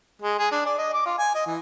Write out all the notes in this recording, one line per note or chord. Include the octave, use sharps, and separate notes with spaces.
G#3
G#4
D4
D5
D#5
D6
F4
G#5
D#5
E3